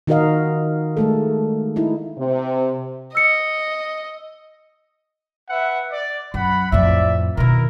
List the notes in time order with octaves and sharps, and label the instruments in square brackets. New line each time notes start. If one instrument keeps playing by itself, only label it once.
[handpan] D#3 D#4 F#4 A#4 D#5 F5
G#3 A3 A4
D#4 E4
[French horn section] C3
[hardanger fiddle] D#5 [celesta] E6 C#7
[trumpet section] B4 E5 F#5
D5
[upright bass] F#2 [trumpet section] F#5 B5
[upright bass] F2 A2 [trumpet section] D5 E5
[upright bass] B2 D#3 [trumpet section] E4 A#4